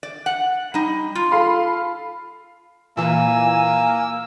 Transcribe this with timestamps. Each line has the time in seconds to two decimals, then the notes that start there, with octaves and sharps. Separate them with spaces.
0.03 D5
0.26 F#5
0.74 G3 D#4
1.15 F4
1.31 A4 F5 B5
2.97 A#2 E3 A#3 G#5 E6